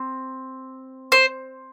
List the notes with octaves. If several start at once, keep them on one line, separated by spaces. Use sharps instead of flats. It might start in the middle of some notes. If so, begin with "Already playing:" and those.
Already playing: C4
C5